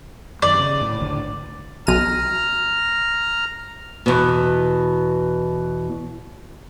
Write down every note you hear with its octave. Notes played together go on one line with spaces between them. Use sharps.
F#2 D#3 D5
C#3
A2
G#1 D2 D3
B1 A#5 F6 D#7
E2 B2